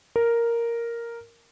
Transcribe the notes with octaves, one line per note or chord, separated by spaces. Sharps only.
A#4